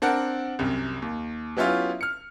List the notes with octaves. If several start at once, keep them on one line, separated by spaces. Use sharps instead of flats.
C4 D4 A#4 F#5
C2 F#2 C3
D#2
F#3 B3 C#4 E4 F4 G4
F6 C#7